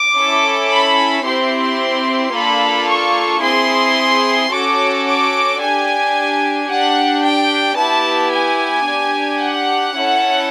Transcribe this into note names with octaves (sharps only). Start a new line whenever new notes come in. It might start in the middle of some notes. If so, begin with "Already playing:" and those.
Already playing: D6
C#4 E4 A4
B5
C4 E4 G4 C6
A#3 D4 F4 A4 B5
C#6
C4 E4 G#4 C6
C#4 F#4 A4 D6
D6
D4 G#5
G4
D4 G4 F#5
G5
B3 E4 G4 A5
G#5
D4 G4
F#5
C#4 E4 A4